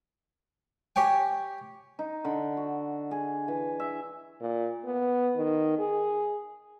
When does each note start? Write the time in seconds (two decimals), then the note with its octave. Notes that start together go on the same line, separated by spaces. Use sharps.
0.96 G4 C#5 G5 G#5
1.99 D#4
2.25 D3
2.57 F#4
3.11 G#4
3.48 E3
3.80 E5
4.41 A#2
4.85 B3
5.36 D#3
5.79 G#4